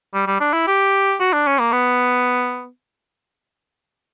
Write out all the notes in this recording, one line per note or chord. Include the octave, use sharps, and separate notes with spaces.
G3
G3
D4
E4
G4
F#4
D4
C#4
A#3
B3